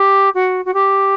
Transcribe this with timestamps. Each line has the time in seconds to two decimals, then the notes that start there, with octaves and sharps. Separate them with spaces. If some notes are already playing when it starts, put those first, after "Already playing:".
Already playing: G4
0.34 F#4
0.65 F#4
0.73 G4